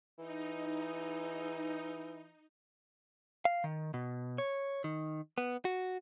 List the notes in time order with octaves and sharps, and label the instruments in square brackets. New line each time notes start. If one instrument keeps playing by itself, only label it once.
[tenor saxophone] E3 [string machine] D#4
[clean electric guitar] F5
D#3
B2
C#5
D#3
B3
F#4